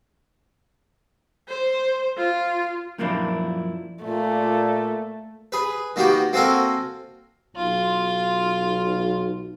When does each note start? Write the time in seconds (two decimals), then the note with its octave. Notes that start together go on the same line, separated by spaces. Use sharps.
1.48 C5
2.17 F4
2.98 F#2 A#2 F3 A#3 D4 E4
4.03 A#2 A3
5.52 G#4 B4
5.96 D#3 A#3 B3 F#4 G4
6.33 A#3 C4 F#4 A4 A#4 G#5
7.56 B1 F4